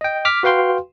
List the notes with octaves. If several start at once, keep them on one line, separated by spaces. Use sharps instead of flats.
D#5 G5
D6 F6 B6
F#4 B4 F5 G5 C6